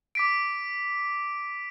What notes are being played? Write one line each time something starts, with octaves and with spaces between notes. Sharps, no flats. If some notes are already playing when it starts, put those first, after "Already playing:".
D6 B6 D7